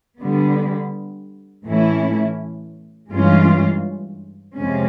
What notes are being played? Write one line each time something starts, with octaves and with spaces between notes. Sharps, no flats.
D3 G3 B3
A2 E3 A3 C#4 E4
G2 E3 G#3 C#4 F4
F2 C3 F3 G#3 C#4